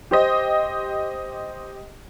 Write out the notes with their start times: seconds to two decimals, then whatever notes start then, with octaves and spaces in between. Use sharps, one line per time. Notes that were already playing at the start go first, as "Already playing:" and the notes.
0.11 G4 C5 D#5